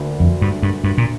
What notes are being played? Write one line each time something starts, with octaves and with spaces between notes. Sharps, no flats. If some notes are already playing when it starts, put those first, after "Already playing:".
Already playing: D2 D3 A#3
F2
G2
G2
G2
A#2